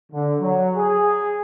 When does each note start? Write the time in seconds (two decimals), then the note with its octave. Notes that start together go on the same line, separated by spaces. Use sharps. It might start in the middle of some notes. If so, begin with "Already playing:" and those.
0.12 D3
0.41 F#3
0.76 G#4